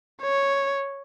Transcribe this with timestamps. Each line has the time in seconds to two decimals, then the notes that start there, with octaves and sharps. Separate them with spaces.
0.22 C#5